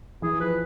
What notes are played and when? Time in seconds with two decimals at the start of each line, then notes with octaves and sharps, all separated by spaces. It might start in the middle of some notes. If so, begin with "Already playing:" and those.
0.22 E3 G#4
0.40 F3 B4